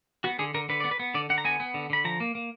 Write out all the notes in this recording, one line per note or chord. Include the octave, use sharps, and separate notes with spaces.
B3 F#4
D3 G#4
D3 A#4
D3 B4
B3 D5
B4
B3
D3 D5
D3 F#5
A#5
B3 G#5
B3
D3
D3 B5
F3 A#5
A#3
A#3